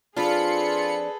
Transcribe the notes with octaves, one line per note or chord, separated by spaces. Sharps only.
F2 D4 F4 G#4 A4 B4 B5 C#7